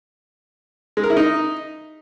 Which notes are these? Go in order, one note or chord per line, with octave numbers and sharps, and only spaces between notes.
G#3
A#4
E4
D#4